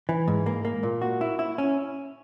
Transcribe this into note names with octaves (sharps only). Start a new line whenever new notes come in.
E3
G#2
A#3
A#3
A#2
F#4
E4
E4
C#4